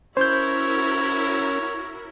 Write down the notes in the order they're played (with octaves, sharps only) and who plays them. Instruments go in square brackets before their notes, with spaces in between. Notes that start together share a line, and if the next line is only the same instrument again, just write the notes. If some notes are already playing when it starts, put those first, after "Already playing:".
[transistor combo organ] C#4 [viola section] E4 F#4 A#4 [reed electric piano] C5 G6 [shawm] C#5